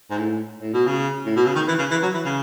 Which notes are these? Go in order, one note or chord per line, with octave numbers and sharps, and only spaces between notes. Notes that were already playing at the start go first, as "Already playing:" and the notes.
G#2
A2
A2
B2
C#3
A2
B2
C#3
D#3
E3
C#3
E3
F#3
E3
C#3